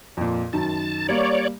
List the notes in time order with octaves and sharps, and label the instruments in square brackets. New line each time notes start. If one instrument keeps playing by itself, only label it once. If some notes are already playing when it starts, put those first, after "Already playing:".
[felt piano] F2 A#2
[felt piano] F#2 D#3 [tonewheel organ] A5
[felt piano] G3 A#3 [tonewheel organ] C#5 D5